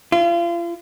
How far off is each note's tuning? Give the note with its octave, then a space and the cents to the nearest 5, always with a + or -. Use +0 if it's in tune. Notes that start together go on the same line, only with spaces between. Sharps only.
F4 -35